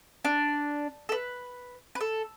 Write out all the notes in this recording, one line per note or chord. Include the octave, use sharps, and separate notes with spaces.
D4
A4
B4
B4
A4